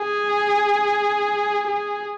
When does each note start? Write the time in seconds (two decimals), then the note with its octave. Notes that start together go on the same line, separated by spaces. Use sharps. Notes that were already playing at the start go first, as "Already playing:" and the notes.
Already playing: G#4
1.67 G#4